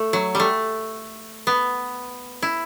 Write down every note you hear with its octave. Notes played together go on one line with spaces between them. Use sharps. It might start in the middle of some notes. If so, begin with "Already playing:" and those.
Already playing: A3
F#3
G3
A3
B3
E4